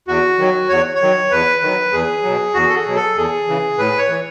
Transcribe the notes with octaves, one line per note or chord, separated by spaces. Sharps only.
E2 F#4
D#3 F#3
E2 C#5
C#5
D#3 F#3
E2 B4
D#3 F#3
E2 G#4
B2 F#3
E2 F#4
A4
G#4
B2 F#3
A4
E2 G#4
C#3 E3
A2 B4
C#5
E3